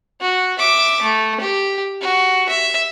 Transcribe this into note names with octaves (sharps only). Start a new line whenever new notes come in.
F#4
E5 D6
A3
G4
F#4
E5